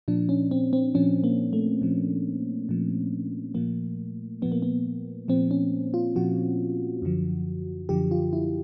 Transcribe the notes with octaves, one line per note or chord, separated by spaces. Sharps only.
A#2 F3 D4
C#4
C4
C4
A#2 F3 C#4
A#3
A3
A#2 F3
A#2 F3
A#2 F3 A#3
A#2 F3 B3
A#3
B3
A#2 F3 C4
C#4
F4
A#2 F3 F#4
F#2 D3 F3
F#2 D3 F3 G4
F4
E4